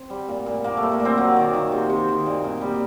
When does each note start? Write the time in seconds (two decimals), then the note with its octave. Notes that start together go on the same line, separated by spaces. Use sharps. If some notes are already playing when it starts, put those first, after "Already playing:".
Already playing: C4
0.10 G3
0.28 A#2
0.46 A#2
0.64 A#2 A#3
0.77 A3
0.83 G3
0.92 A#3
1.00 A#2
1.05 C4
1.17 F#3 A#3
1.37 D#3
1.53 D#3
1.72 C3
1.90 C3
2.08 D#3
2.26 A#2
2.44 A#2
2.61 G3